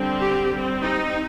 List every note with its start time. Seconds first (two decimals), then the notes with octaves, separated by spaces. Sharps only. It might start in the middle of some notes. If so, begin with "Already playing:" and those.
Already playing: D3 G3 C4
0.21 G4
0.51 G3 C4
0.82 D#4